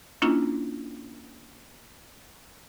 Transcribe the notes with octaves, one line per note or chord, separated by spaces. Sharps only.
A#3 C#4 D4 E4 F4